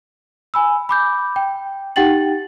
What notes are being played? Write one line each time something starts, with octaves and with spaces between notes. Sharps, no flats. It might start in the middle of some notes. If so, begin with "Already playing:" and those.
G#5 B5 E6
B5 D6 G6
G5
D#4 G4 F#5 G5 A6 F#7